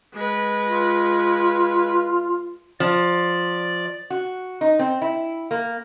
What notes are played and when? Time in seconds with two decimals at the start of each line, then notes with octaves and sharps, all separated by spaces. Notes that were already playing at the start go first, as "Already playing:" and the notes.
0.14 G#3 B4
0.65 F4
2.80 F3 D5
4.10 F#4
4.61 D#4
4.79 C4
5.02 E4
5.51 A#3